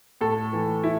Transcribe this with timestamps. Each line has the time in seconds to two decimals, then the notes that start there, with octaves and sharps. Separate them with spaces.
0.21 A2 A4
0.53 E3
0.84 E4